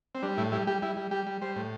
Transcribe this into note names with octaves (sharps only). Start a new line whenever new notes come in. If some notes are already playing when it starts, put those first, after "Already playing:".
C4
G3 D4
A2 E4
G3 E4
G3 G4
G3 E4
G3
G3 G4
G3
G3 C5
A2